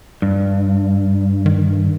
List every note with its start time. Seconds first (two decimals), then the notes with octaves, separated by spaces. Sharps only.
0.22 G2
1.46 D#3